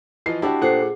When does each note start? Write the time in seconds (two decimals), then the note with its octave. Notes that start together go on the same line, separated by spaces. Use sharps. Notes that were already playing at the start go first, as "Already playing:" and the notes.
0.26 E3 F3 D#5 C7
0.42 D4 E4 F#4 G4 A5
0.61 A#2 A4 C5 F#5 C7
0.82 G#4